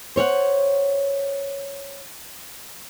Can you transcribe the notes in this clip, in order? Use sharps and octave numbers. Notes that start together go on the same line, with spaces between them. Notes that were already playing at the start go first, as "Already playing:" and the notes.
C5 C#5 F5 F#5